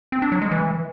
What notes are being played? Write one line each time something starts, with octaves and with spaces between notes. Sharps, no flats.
C4
D4
F#3
G#3
E3